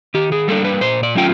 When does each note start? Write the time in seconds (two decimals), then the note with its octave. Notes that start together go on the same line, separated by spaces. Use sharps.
0.14 D#3 G4
0.32 G#4
0.48 G3 A#3 D4 A4
0.64 B4
0.81 A#2 C5
1.03 D5
1.15 F#3 A3 C#4 F4 G5